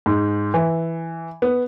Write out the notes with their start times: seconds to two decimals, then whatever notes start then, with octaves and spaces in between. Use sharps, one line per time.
0.06 G#2
0.54 E3
1.42 B3